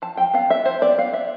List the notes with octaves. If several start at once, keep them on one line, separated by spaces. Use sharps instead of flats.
F3 A5
F3 G5
B3 F5
B3 E5
F3 C5
B3 D5
B3 F5
B3 E5